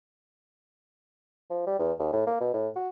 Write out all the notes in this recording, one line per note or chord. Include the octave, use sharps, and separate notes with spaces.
F3
G3
E2
D#2
A2
A#3
B2
A2
F#4